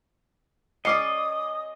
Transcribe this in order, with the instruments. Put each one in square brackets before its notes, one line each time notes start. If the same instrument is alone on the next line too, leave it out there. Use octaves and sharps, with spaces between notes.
[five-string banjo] G#3 C#4 D5 [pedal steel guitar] D#5 [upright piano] D6 C7 C#7 [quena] D#6